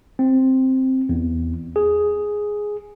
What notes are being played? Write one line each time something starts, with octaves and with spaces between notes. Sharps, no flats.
C4
E2
G#4